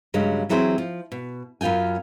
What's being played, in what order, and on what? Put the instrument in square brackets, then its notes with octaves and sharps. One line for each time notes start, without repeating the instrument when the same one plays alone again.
[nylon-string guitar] G2 C#3 F#3 G#3
E3 F#3 C4 E4 G#4 C5
F3
B2
F#2 B3 F4 G5 G#5